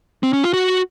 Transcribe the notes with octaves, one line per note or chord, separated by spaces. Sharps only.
C4
C#4
F4
F#4